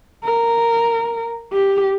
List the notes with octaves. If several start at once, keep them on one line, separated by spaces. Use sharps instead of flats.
A#4
G4